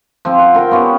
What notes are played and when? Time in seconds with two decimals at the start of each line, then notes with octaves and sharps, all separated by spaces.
0.25 F3 C4
0.39 F#5
0.54 F4 A#4 G5 C6
0.71 B3 C#4 F4 G4